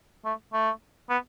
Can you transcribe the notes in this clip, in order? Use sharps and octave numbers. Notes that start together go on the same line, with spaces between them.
A3
A3
B3